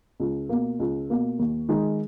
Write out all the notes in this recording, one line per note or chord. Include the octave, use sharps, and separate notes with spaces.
C#2
B2 A#3
C#2
B2 A#3
D#2
D#3 G#3 D#4